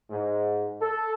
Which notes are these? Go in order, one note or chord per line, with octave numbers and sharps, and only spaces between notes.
G#2
A4